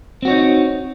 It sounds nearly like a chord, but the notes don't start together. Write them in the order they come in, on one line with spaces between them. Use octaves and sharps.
C4 F#4 C#5 D#4